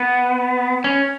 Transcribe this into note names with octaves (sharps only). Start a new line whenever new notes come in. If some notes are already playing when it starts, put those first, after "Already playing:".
Already playing: B3
C#4